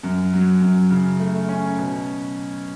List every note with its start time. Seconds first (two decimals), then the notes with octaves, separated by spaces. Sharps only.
0.03 F#2
0.33 F#3
0.62 F#2
0.90 C#3
1.20 A3
1.49 C#4
1.79 B2